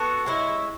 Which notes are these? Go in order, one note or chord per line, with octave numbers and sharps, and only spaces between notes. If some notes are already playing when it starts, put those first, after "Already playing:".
Already playing: B3 F#4 A4
G#3 C#4 E4